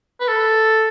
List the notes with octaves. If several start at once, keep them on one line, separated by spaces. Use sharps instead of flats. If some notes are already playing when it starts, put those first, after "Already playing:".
B4
A4